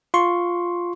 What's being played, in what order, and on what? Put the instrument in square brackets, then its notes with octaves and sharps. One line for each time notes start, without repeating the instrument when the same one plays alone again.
[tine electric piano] F4 C6 C#6